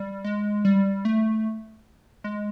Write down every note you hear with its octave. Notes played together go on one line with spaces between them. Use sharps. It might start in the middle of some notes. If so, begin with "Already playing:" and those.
Already playing: G3
G#3
G3
A3
G#3